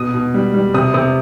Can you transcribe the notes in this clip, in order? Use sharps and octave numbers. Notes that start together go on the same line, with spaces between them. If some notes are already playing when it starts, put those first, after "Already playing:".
Already playing: B2 D#6
B2
G3
G3
C3 D#6
C3 D#6